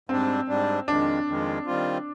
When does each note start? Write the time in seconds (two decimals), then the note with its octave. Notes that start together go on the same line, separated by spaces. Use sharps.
0.09 G#2 G3 C4 D4
0.48 G#2 G3 D4
0.88 F2 D#3 G#3 D4
1.27 F2 D#3 G#3
1.66 D#3 G3 C4 F4